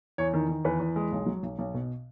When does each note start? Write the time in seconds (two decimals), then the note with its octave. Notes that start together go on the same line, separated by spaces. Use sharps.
0.18 E2 C#5
0.34 D#3
0.49 D#3
0.65 E2 B4
0.80 E2
0.96 G#3
1.12 B1
1.26 F#3
1.43 B1
1.59 B1
1.74 B2